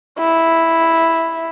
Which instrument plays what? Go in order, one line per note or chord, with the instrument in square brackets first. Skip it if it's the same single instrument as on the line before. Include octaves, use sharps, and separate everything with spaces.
[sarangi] E4